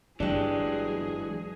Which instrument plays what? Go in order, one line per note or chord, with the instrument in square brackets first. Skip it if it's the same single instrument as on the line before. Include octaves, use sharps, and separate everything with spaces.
[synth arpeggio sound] G1 [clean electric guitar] E3 F#3 G#3 [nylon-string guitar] D4 G4 [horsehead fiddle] G#4